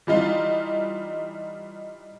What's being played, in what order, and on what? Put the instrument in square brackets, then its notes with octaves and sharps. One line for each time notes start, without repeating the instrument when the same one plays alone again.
[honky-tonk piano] E3 G3 D#4 F4